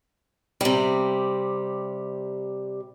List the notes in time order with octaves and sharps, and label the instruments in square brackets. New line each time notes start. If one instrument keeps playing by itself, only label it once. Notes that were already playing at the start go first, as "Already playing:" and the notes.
[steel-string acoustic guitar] C3 G3